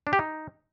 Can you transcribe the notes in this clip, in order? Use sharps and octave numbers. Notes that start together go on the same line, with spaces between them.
D4
G4
D#4